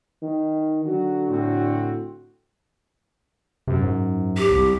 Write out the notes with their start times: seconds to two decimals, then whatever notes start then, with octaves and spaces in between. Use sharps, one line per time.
0.22 D#3
0.85 D3 F#3 F#4
1.28 A2 C4 F#4
3.68 F#2 C3
3.83 G#2
4.38 G4
4.51 C2